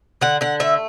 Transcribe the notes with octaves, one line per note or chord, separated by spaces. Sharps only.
D3 F#5
D3 F#5
A3 E5